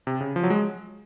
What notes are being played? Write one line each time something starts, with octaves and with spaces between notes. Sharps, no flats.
C3
C#3
F3
F#3
G#3